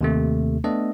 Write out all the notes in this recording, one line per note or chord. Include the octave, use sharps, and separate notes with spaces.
D#2 C3 A3
A3 B3 D4 A4 D#5